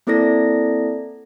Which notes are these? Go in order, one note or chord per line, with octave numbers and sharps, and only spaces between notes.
A#3 C4 E4 A4 D5 A#6